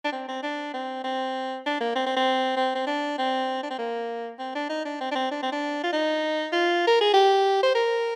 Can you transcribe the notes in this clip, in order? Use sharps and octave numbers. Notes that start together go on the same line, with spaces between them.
D4
C4
C4
D4
C4
C4
D4
A#3
C4
C4
C4
C4
C4
D4
C4
D4
C4
A#3
C4
D4
D#4
D4
C4
D4
C4
D4
C4
D4
F4
D#4
F4
A#4
G#4
G4
C5
A#4